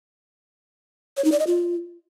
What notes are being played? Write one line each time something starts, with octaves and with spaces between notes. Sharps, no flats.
C#5
D#4
D5
D#5
F4